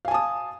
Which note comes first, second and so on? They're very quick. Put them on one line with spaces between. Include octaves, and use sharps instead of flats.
F5 G#5 A5 D#6